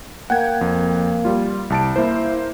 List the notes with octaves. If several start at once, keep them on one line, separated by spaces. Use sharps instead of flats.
A#3 F#5 G5 G#6
F2
G3 F4
C2 A5 D7
A#3 E4 C5